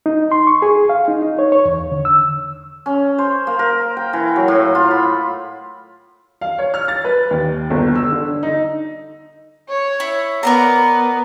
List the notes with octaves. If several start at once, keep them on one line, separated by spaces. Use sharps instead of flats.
D#4
C6
C#6
G#4
F5
D#4
D#4
C#5
C#5
E2
D3
E6
C#4
C5
A#3
A#4
G5
E3
F#3
A2
F4
B5
F5
C#5
F6
A6
B4
D#2
G1
E6
D3
D#4
C#5
E4
B3 A#4 D5 A#5